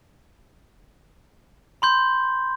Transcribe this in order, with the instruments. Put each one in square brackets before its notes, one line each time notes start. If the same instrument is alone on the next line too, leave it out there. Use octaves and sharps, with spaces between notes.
[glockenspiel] B5 C6 G6